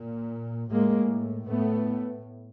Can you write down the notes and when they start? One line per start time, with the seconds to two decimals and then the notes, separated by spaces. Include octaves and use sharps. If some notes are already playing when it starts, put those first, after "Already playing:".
Already playing: A#2
0.70 A2 G#3 A#3
1.48 A2 A3 B3